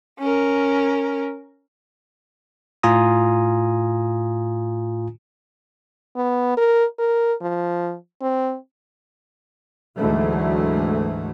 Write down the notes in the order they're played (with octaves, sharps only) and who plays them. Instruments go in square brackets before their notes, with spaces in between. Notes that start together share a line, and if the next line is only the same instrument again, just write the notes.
[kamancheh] C#4 A#4
[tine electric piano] A2 F4 G#5 A#5 D#6
[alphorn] B3
A#4
A#4
F3
C4
[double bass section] D2 G#2 E3 F#3 A3